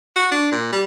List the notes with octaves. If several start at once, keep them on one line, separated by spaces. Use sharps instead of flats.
F#4
D4
A#2
G3